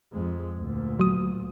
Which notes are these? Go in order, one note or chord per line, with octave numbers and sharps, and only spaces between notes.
F2 G#3
D2 A#2
F#3 D#6